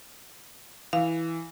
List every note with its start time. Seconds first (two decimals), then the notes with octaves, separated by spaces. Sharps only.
0.93 E3 F5